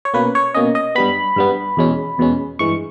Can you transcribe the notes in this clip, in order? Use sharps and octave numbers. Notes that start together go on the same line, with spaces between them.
C#5
B2 A#3 C#4 B4
C#5
B2 A#3 C#4 D#5
D#5
G2 G3 B3 B5
G2 G3 B3
E2 B2 G#3 C#4
E2 B2 G#3 C#4
G2 E3 G#3 C#6